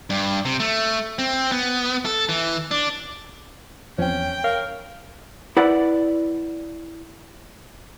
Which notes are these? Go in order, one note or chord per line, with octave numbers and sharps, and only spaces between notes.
G2
C3
A3
C4
B3
A4
E3
D4
E2 F3 C4 C#4 G5
A#4 C#5 F5
E4 B4 D5 F#5